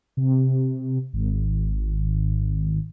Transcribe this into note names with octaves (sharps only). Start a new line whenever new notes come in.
C3
G#1